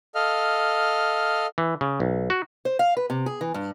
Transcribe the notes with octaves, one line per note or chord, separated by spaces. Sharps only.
A4 D#5 F5 F6
E3
C#3
B1
F#4
C5
F5
B4
C3
G#4
E3
G2